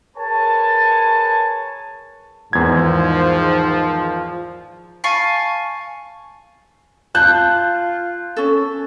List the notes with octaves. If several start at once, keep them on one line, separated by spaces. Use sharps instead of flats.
G#4 A#4 B4 C#5 G#5 A5
E2 G#2 D#3 F3 G#6
F5 G#5 A5 C#6
F4 A5 F#6 G6
C#4 A4